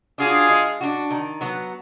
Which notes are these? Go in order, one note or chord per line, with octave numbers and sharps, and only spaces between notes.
D4 F4 F#4 G#4
G#3
D4 F#4
D#3
F#3 B3